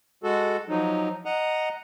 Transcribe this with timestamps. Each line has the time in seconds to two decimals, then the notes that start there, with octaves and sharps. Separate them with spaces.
0.24 G#3 F#4 A4
0.69 F3 F#3 D#4
1.25 D#5 F#5 A#5